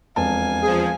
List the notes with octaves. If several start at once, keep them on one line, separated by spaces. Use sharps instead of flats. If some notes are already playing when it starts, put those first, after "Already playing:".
E1 F2 F5 G#5 A5
F3 G#4